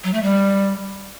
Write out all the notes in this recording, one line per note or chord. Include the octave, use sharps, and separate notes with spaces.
F#3
A3
G3